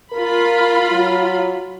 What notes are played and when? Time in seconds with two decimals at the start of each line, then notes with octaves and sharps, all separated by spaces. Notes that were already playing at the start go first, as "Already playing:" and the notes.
0.13 F4 A#4 B5
0.92 F#3